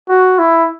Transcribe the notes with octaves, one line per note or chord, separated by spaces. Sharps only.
F#4
E4